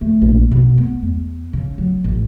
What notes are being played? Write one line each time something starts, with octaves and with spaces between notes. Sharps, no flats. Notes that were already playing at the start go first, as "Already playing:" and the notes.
A3
A#1
B2
B3
E2
C#3
F#3
A1